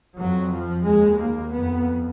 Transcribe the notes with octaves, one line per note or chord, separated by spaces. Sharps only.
F2 F#3
F3
D#2 G#3
A#3
F2 B3